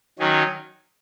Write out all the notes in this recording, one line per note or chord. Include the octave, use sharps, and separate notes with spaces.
D#3 F#3 C#4